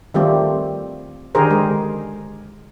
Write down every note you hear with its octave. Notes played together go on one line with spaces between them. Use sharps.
D#3 G3 A3 C4 F4 G4
D3 D#3 G4 G#4 A#4 C5
G#3